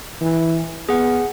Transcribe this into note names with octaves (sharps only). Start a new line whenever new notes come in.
E3
B3 G#4 F#5